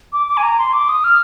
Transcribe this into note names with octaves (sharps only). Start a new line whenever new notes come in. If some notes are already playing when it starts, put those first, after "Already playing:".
D6
D6
G#5
A#5
C6
D6
D#6
F6